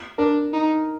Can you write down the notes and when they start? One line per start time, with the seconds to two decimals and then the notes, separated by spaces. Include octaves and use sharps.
0.18 D4 A#4
0.53 D#4